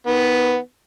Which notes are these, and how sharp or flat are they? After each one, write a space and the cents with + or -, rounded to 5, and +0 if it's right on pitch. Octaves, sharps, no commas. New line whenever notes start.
D#3 +25 B3 +0